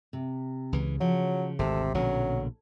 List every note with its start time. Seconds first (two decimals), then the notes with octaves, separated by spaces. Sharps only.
0.13 C3
0.72 C#2 C#3 E3
1.01 C#3 F3 F#3
1.59 G#1 D2 C3 A4
1.95 A#1 B2 D3 F#3 C#4